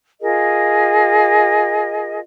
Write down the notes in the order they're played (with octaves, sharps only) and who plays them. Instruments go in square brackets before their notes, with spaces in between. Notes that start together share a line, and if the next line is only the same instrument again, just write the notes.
[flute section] F4 G#4 A#4 D#5